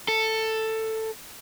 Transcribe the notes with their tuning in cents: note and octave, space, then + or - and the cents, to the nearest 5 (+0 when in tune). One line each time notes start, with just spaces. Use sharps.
A4 +10